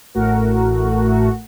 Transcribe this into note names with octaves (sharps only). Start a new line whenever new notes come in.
A1 A2 A3 F#4 A#4